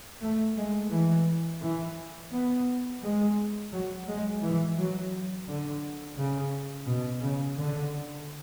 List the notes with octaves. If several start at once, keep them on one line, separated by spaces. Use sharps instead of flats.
A3
G#3
E3
E3
B3
G#3
F#3
G#3
E3
F#3
D3
C#3
B2
C#3
D3